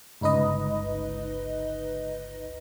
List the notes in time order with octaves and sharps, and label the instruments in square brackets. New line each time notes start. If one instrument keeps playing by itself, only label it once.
[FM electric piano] G1 C#2 D#4 B4 D#5